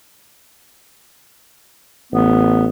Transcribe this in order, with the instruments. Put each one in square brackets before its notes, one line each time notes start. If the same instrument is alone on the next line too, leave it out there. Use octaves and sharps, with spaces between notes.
[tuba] A1 [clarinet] B3